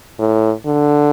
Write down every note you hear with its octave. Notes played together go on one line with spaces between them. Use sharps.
A2
D3